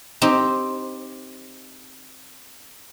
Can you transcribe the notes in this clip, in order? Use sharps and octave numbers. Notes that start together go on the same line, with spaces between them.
C4 D#4 G4 C5